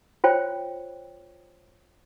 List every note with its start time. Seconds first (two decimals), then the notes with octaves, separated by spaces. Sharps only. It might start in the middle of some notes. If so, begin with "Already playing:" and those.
0.24 F4 C5 C#5 G5